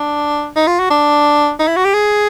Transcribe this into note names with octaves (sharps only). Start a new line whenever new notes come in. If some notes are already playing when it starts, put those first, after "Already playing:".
Already playing: D4
D#4
F4
F#4
D4
D#4
E4
F#4
G4
G#4